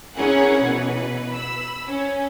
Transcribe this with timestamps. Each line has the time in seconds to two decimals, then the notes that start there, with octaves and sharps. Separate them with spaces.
0.17 C#4 E4 G#4 A#4 C#5 F#5
0.64 B2 E3 B4
1.31 B5 E6
1.88 C#4